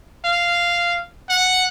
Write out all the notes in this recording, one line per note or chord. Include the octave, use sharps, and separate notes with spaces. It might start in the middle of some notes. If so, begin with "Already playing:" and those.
F5
F#5